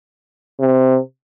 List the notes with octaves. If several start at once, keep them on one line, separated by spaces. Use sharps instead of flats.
C3